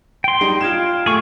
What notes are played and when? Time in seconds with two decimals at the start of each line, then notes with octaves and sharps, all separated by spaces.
0.24 G5 C6
0.41 G3 D#4
0.61 F4 G#6 E7
1.06 A3 G#4 C#6